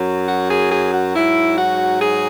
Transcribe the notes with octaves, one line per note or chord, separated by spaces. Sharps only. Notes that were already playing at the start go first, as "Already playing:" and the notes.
Already playing: F#2 F#3
F#4
G#4
G#4
F#4
G#2 F#3 E4
F#4
G#4